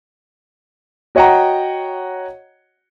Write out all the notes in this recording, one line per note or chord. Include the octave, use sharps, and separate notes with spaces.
F#4 C#5 D#5 F#5 G5 A#5